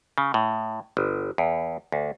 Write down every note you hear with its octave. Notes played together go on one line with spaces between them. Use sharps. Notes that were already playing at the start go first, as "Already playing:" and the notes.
C#3
A2
G1
E2
D2